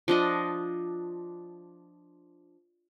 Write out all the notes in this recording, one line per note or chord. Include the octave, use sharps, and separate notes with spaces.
F3 D4 D#5